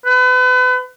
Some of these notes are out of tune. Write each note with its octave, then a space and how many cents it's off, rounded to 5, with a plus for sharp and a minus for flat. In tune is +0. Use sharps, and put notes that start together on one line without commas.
B4 +35